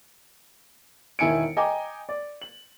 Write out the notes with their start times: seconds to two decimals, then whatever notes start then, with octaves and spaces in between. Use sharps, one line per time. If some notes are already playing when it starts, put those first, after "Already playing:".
1.19 E1 D#3 E4 G#5 C#7 D7
1.57 D#5 G5 G#5 A#5 D6
2.09 D5
2.42 F#7